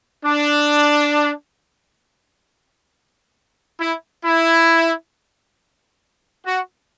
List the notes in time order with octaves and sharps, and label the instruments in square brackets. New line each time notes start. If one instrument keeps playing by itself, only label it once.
[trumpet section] D4
E4
E4
F#4